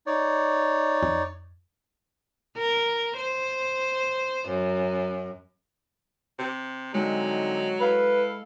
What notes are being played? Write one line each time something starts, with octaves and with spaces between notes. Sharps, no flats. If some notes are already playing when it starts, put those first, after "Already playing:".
D#4 C#5 D5
F2
A#4
C5
F#2
C3
D3 F#3 G#3 C4 D#4
E4 A4 B4 F5